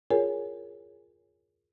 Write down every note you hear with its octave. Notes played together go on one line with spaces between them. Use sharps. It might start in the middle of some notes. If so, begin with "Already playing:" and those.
F4 G#4 A#4 C#5 G#5